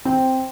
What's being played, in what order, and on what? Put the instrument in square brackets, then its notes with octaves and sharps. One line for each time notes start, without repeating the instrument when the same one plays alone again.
[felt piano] C4